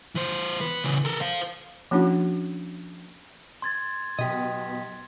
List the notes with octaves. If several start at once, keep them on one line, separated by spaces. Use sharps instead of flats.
E3 C5
B3 B4
C#3 E3
A4 A#4
C5 F5
F3 A#3 C#4 D4 E4 F#4
C6 G#6 A6
B1 B2 G4 D#5